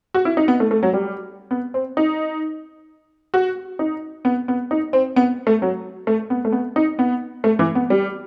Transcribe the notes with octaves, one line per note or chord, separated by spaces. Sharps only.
F#4
E4
D#4
B3
A3
A3
F#3
G3
B3
C4
D#4
F#4
D#4
B3
B3
D#4
C4
B3
A3
F#3
A3
B3
A3
B3
D#4
B3
A3
E3
B3
G3